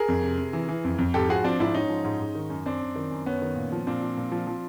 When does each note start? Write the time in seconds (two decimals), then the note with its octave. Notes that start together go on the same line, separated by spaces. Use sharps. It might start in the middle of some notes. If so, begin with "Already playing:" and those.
Already playing: G#4 A#4
0.08 F2
0.23 C3
0.38 C3
0.53 E3
0.69 E3
0.84 F2
0.99 F2
1.14 G#2 G4 A4
1.29 F3 F#4 G#4
1.44 F3 C4 D4
1.60 G#2 D4 E4
1.74 G#2 C#4 D#4
1.89 F3
2.05 G#2
2.20 G#2
2.35 D#3
2.50 F#2
2.66 F#2 C4 D4
2.81 F#2
2.96 D#3
3.11 F#2
3.26 F#2 B3 C#4
3.42 D#3
3.56 A#2
3.72 F3
3.87 A#2 C4 D4
4.02 F3
4.18 A#2
4.32 F3
4.47 F3